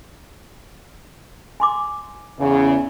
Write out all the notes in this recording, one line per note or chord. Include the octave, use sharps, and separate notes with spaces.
G#5 C6 D6
E2 C#3